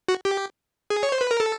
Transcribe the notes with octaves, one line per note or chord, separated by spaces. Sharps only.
F#4
G4
G#4
C#5
C5
B4
A#4
A4